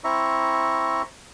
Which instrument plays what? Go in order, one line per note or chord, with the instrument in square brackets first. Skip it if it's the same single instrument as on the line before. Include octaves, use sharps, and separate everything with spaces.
[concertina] C4 E4 E5 A#5 C#6